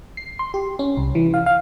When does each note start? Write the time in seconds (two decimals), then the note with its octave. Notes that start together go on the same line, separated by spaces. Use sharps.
0.17 C7
0.39 C6
0.54 G4
0.79 C#4
0.97 C2
1.15 E3
1.34 F5
1.46 F5